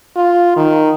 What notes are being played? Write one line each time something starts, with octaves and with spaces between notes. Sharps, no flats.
F4
D#3